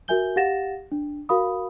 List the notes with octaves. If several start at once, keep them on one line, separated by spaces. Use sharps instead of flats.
F#4 A#4 E5 G#5 G6 G7
G4 F5 F#5 A6 A#6 E7
D4
F#4 A#4 F5 B5 D#6